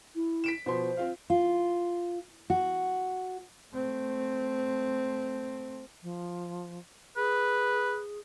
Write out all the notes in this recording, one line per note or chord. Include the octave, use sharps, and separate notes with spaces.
E4
B6 D7 E7
B2 F3 C5 C6
C4 F4 F5
F4
F#4
A3 C4
F3
G#4 B4